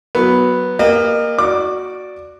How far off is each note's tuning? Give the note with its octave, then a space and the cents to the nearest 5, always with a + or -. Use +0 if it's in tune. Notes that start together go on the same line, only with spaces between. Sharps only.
F#3 +0 B3 +0
A#3 +0 G4 +40 D#5 -30
F#4 +0 D5 +0 D6 +20